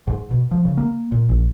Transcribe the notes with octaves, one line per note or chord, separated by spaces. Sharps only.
G#2
B2
F3
C#3
A#3
A#2
A#1